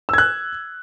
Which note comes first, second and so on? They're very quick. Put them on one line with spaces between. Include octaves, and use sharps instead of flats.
E6 G#6 F#6